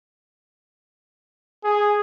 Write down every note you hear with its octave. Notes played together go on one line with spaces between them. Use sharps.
G#4